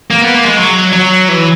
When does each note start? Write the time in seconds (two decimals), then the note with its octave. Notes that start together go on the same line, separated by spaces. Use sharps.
0.11 A#3
0.22 B3
0.34 A#3
0.45 G#3
0.57 F#3
0.93 F#3
1.29 E3